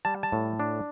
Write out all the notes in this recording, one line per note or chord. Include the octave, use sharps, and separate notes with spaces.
G3 A5
A5
A2
D4